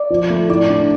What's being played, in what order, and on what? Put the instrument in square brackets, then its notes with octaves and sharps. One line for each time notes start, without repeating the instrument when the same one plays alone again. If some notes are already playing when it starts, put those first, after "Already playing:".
Already playing: [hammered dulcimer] D5
[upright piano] F3
A3
[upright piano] A2 [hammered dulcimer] D5
[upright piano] D4